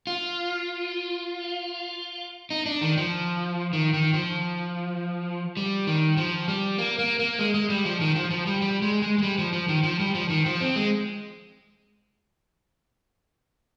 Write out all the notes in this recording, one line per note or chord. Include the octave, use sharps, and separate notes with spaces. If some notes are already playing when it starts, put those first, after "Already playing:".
F4
D#4
D4
D#3
F3
D#3
D#3
F3
G3
D#3
F3
G3
A#3
A#3
A#3
G#3
G#3
G3
F3
D#3
F3
F3
G3
G3
G#3
G#3
G#3
G3
F3
F3
D#3
F3
G3
F3
D#3
F3
C4
G#3